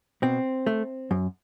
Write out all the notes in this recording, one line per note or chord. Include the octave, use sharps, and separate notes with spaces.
B2 C4
A3
F#2